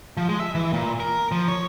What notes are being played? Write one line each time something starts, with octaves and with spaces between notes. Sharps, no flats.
F3
G#3
E5
E3
A#2
A#4
F3
C#5